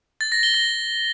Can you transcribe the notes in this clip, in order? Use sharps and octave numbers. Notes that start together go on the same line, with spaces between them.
A6
A#6
G7
A#6